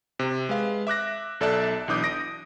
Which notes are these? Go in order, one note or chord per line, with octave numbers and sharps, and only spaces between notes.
C3
G#3 B4 F5
E5 D6 F#6 A#6
B1 A4 D5 E5 A5 F#6
B1 E3 D4 D6 D#6 G6
D#6 A#6 D7